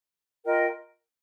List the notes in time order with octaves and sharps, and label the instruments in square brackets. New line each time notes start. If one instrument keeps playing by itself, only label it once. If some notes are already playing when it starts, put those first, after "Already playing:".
[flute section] F4 A#4 D#5 G5